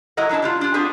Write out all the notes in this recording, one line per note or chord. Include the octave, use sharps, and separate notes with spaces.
F#3 E4 A#4 D#5 F#5
F#3 A#3 D4 E4 A5
G3 D4 F4
D4 F4
B3 C4 D4 F4 G#4 B4